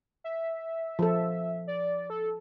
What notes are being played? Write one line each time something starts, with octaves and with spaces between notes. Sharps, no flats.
E5
F3 A4
D5
A4